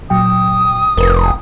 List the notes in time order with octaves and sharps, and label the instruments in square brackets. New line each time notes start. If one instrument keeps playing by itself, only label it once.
[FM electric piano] A#2 F#3 G5 [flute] D#6
[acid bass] F1 [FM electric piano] A#4 B4